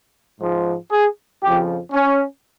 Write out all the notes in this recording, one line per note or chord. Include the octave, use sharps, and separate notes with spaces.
G#2 F3
G#4
F2 C#3 F3 G4
C#4